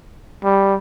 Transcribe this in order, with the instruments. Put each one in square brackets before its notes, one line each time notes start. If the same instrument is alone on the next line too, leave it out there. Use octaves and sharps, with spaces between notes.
[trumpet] G3